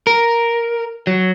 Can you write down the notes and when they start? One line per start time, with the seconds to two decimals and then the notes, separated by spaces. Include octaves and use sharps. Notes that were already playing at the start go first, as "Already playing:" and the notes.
0.07 A#4
1.07 F#3